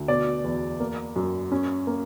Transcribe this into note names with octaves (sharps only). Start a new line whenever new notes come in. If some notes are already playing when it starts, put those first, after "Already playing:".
Already playing: D2
B2 D5
E2
A#3
F#2
C#4
A#3